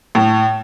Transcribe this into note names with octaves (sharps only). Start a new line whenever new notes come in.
A2